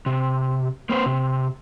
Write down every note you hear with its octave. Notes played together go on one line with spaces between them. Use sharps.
C3
A#3 C4 B4 C5
C3